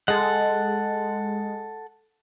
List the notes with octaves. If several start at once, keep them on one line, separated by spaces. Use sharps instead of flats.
G#3 A4 F#5